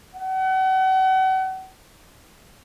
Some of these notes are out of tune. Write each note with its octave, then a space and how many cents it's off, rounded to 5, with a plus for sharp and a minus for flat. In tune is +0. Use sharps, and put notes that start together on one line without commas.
F#5 +40